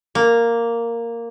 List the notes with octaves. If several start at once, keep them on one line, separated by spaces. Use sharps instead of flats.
A#3